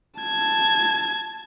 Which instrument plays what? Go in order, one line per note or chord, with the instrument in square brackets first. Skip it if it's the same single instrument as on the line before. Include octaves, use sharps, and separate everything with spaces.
[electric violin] A5 G#6